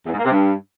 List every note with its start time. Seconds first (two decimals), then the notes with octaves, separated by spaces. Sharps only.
0.06 E2
0.12 G#2
0.19 A#3
0.25 C3
0.31 G2